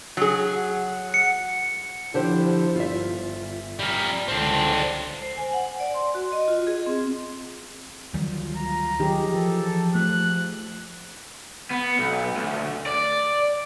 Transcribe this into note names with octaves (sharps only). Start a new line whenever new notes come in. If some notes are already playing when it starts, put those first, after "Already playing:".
F#3 G#4
F#5
C#7
D3 F3 E4 G4 C5
G1 F4 E5
G3 A#4
C#2 D3 C4 D4
C5
G#5
F#5
D5
C6
F#4
D#5
F4
G#4
C4
D2 D#3 F#3 G3 F4
A#5
D#3 F3 F#3 D#4 G4 G#4
E3 A4
A3 F#6
B3
B1
D2
D5